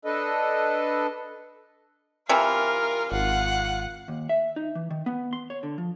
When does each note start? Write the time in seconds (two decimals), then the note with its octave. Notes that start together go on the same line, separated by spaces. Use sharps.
0.05 D4 A4 B4 D#5
2.29 C3 E3 F4 A#4
3.12 G#1 F4 F#5
4.08 D#2
4.29 E5
4.56 D#4
4.75 E3
4.90 D#3
5.06 B3
5.33 C6
5.50 C#5
5.63 D3
5.78 F3